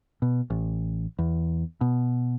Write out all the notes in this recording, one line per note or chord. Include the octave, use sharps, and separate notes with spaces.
B2
A1
E2
B2